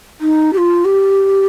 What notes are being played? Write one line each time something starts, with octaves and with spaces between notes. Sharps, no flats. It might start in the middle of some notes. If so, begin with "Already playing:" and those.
D#4
G4
F4
G4